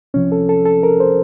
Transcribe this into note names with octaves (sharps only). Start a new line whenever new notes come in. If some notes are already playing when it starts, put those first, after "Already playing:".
C2 C3 F3 C#4
A4
A4
A4
A#4
C5